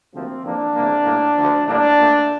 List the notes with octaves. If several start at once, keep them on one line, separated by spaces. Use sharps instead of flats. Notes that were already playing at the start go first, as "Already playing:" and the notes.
D2 C3 F3 A#3 C4
F2 E3 A#3 D4
E2 C3 G3 A#3
A2 G3 A#3
D2 D3 F3
A2 G3 A#3 D4
A#2 A3